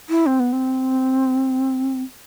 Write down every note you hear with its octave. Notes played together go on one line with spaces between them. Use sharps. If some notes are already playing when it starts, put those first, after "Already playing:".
E4
C4
B3
C4